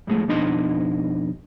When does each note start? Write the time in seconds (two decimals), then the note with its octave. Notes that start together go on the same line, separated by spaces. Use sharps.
0.07 F2 A2 G#3 A3
0.28 F2 B2 D4 D#4 D#5 C6